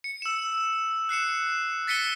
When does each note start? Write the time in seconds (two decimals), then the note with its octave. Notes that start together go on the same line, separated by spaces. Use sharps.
0.04 C#7
0.22 E6 E7
1.09 F#6 C7 C#7 E7
1.87 A6 B6 C#7 D#7 G7